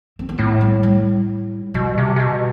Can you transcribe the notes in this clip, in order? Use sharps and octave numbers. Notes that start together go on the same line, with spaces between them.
C4
B3
A2 A3
G3
G3
B2 G3
C3
C3
B2